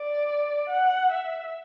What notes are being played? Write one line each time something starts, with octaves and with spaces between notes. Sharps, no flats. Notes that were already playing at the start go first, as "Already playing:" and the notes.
Already playing: D5
F#5
E5